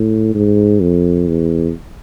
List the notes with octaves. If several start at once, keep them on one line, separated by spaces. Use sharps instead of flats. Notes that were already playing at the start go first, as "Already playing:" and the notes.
Already playing: A2
G#2
F2
E2